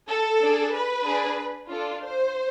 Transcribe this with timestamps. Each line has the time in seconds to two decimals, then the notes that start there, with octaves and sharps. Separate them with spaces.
0.09 A4
0.41 D4 G#4
0.74 B4
1.06 D4 G#4
1.70 D4 F4 A4
2.03 C5